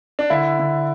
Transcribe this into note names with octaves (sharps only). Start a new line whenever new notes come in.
D4
D3 E4
D3